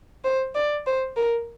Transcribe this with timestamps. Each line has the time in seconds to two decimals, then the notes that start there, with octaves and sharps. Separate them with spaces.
0.24 C5
0.55 D5
0.87 C5
1.17 A#4